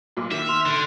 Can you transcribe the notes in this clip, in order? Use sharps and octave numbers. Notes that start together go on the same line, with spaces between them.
B1 A#2
D#3 E5
C6 F6 F7
D3